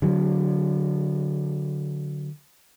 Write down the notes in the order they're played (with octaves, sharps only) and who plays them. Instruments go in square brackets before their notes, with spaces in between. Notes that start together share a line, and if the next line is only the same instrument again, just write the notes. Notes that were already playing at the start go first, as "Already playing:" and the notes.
[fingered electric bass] D3 F#3